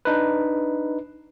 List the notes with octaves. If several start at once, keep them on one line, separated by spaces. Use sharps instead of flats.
D4 D#4 B4